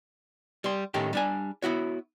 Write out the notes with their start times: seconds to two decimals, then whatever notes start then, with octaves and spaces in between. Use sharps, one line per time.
0.64 G3 C6
0.94 A2 D#3 A3 C#4 D#4 G4
1.13 G3 D4 G#5
1.62 B3 E4 F#4 C#5